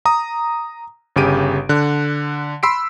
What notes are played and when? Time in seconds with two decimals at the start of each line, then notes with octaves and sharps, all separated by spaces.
0.05 A#5 D#6
1.16 G1 C#3 G4 D7 D#7
1.69 D3 F#6
2.63 B5 C6 E6 B6 C7 D7